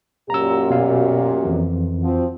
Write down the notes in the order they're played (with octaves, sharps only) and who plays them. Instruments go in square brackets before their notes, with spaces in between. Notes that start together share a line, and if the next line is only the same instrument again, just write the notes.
[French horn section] F#2 A#2 G4 [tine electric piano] A#5 E6
[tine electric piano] B2 F5
F2 E3
[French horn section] F3 C4 F#4